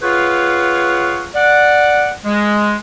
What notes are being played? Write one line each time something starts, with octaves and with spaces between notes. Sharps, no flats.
F4 G#4 B4 C#5 F5 F#5
D5 F#5
G#3